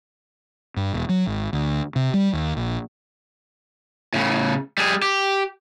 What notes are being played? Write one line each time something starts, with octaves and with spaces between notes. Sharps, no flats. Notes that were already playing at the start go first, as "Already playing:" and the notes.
G2
E1
F#3
G#1
D2
C3
G3
D#2
A#1
A2 C#3
G3 G#4
G4